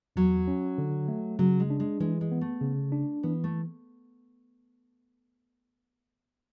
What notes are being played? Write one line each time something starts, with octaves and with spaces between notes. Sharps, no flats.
E2 F#3
C#4
D3
A3
C#3 F#3
G#3
D4
G#3
E3 G#3
G#3
B3
A3
C#3
D4
E3 B3
A3